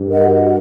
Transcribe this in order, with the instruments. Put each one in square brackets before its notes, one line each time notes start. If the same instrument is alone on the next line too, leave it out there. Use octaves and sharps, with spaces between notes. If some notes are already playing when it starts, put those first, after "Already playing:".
Already playing: [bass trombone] G2
[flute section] A#4 D#5 F#5
F#4
A#4 D#5 F#5